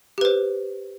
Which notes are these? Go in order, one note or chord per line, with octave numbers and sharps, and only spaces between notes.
G4 B4 C5